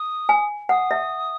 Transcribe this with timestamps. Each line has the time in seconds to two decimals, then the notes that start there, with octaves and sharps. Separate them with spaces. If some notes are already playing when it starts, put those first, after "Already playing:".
Already playing: D#6
0.29 G#5
0.69 F#5 D#6
0.91 E5